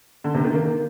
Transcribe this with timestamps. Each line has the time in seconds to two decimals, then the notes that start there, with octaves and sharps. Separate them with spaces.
0.24 D3
0.34 C3
0.45 D#3
0.55 A#3